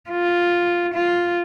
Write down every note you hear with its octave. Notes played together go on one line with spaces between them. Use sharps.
F4
F4